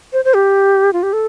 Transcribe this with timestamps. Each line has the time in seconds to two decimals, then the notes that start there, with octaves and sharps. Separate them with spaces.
0.13 C5
0.25 C5
0.35 G4
0.93 F4
1.03 G4
1.13 A4